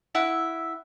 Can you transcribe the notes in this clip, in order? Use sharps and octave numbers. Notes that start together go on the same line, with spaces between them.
E4 E5 F#5